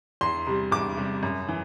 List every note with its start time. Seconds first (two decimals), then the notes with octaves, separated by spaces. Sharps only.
0.21 E2 C6
0.47 C3 G3
0.72 E2 D6
0.97 C3 G3
1.23 F#2
1.49 E3